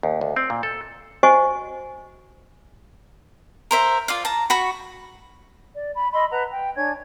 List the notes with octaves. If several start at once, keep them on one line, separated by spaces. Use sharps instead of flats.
D#2
D2
C4
A#2
A4
F#4 C5 D#5 G#5 C#6
A#4 C5 E5
F4 D5 F5
A5 A#5
F#4 B5 C#6
D5
B5
D#5 B5 C6 E6
B4 F#5 A5 A#5
G5
D4 C#5 G#5 G#6